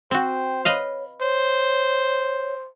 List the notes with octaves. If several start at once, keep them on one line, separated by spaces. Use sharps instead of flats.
C4 F#4 C5 G5
B4 C#5 D#5 F5
C5 C#5